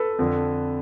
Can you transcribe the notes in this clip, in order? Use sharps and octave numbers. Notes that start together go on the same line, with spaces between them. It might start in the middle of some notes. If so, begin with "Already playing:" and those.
Already playing: A4 B4
F2 D3